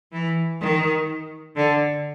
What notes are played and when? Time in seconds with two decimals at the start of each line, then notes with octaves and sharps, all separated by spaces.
0.12 E3
0.61 D#3
1.56 D3